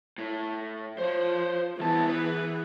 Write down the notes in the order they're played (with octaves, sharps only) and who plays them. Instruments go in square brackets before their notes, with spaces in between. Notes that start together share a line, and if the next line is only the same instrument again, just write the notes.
[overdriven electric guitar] A2
[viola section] F3 [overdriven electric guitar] C5 C#5
[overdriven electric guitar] C2 A5 [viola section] E3 B3 G#4
[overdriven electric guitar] B4